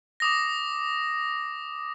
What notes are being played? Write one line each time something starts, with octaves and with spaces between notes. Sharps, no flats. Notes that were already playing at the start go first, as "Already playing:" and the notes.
D6 D#6 A#6